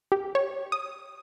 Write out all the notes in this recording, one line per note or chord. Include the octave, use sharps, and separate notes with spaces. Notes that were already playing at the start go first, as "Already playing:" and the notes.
G4
C#5
D#6